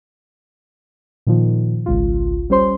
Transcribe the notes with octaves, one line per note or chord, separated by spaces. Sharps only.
A#2 D#3 F3
G#1 C#2 F4
G3 C#4 C5 C6